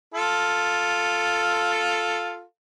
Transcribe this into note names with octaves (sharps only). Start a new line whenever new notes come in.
F4 A4